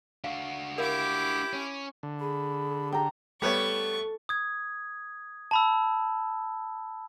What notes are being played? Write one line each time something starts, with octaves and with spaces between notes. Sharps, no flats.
D4 F#4 F5
E4 G4 A#4 F5 D6
C#4
D3
G#4 B5
G4 G5 A#5
G3 A3 B3 C#5 C#6
D#6 G#6
A5 B5 E6